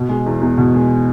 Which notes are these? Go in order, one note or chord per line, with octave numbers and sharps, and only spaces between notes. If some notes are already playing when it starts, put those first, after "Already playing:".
Already playing: B2
G#3
E2
E2
B2
G#3